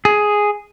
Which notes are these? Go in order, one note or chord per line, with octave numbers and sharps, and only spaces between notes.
G#4